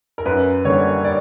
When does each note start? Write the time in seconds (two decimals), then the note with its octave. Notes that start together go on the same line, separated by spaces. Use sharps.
0.18 A#4
0.25 F#2 B4
0.65 D3 G3 A#3 C#5
1.04 D5